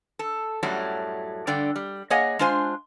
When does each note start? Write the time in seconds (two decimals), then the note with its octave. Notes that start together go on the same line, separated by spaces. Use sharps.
0.19 A4
0.63 F#2 A2 F#3 G3 A3
1.47 G2 D3 D5 G5
1.76 G3
2.10 A#3 G#4 C#5 D#5 F#5 G#5
2.39 G#3 D4 F4 C5 G#5